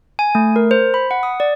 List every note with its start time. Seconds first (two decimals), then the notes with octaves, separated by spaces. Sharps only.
0.19 G#5
0.35 A3
0.56 A#4
0.71 C5
0.94 B5
1.11 F#5
1.23 D#6
1.40 D5